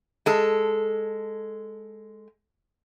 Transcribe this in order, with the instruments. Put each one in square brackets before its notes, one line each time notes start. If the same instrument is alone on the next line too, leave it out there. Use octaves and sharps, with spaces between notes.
[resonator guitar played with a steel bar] G#3 A4